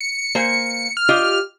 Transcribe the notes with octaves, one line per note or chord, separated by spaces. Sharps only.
C#7
A#3 C5 G#5
F6
F4 G4 D#5